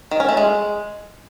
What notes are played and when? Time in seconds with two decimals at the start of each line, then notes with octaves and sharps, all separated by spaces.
0.11 D#3
0.20 C#4
0.29 A3
0.37 G#3